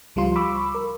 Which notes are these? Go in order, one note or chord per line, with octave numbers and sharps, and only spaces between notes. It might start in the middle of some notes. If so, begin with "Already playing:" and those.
C#2 F3 G3 F4 C6
B5 C#6 D6 E6
A#4